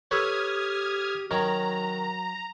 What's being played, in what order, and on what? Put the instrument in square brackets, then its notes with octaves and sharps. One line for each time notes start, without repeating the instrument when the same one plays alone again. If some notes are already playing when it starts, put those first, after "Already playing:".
[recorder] G4 [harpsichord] A4 B4 C#5 [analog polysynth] D#6 F6 G#6
[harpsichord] D#3 C#4 [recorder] F#3 [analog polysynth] A#5